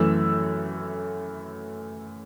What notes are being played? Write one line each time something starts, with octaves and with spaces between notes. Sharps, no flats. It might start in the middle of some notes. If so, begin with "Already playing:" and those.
Already playing: F#2 E3 A3 E6